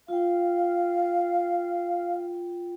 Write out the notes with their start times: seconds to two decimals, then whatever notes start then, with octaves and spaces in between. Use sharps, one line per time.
0.08 F4 F5 G5